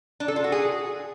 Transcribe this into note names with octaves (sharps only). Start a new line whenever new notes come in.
D4
A4
F4
F#4
G#4